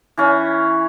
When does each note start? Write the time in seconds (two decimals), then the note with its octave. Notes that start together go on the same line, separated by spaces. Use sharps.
0.18 E3 C#4